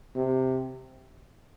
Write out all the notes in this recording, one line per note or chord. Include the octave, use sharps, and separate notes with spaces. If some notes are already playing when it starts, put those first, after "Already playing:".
C3